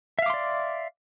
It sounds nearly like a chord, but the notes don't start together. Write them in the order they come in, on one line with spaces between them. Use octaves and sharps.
E5 F5 D6 C6 D5